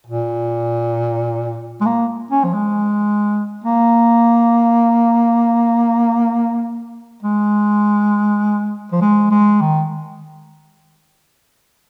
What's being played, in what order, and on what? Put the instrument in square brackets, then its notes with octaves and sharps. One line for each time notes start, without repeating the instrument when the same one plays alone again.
[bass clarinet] A#2
G#3
A#3
C#4
F3
G#3
A#3
G#3
F3
G#3
G#3
D#3